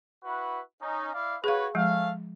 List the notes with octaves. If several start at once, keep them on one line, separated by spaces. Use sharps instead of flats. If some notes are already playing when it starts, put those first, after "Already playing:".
E4 F#4 B4
C#4 D#4
E4 D5 F5
F#4 G#4 B4 C#5 F5
F3 G#3 A3 C#4 F5